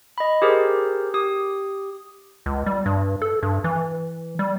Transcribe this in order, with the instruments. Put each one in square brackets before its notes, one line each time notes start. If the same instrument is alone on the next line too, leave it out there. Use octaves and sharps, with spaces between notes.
[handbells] D#5 B5
G4 G#4 A#4 C5
G4 D#6
[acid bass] C#2
G3
G2
A4
G2
E3
G3